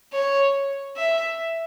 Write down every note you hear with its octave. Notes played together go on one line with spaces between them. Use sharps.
C#5
E5